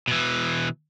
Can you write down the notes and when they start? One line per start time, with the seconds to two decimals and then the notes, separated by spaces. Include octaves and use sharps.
0.08 B2 E3